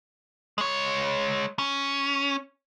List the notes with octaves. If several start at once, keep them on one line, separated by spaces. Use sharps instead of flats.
G#3 C#5
C#4